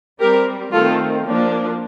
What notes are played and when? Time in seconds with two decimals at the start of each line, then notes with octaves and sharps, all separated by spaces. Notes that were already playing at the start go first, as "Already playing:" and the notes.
0.20 G3 C4 G4 A#4
0.72 D#3 A3 C4 F4 A4
1.25 F3 A#3 D4